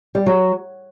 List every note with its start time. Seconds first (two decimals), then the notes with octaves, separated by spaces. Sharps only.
0.15 G3
0.26 F#3